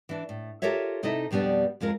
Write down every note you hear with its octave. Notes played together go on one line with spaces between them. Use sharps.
E3 D4
A2
F4 G4 A4 A#4 C#5 E5
C3 D#4 E4 A4 D#5
F2 B2 G3 B3 D4
F2 G#3 F4 A#4